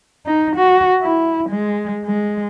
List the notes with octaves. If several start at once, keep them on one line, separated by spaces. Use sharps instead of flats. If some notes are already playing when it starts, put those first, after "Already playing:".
D#4
F#4
E4
G#3
G#3